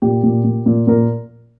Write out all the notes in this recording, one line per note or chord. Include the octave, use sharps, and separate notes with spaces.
A#2 G4
A#2
A#2
A#2
A#2 A#4